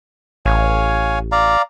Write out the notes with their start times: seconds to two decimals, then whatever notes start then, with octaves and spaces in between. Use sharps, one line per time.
0.46 A1 C#5 F5 G#5
1.32 D5 F5 A#5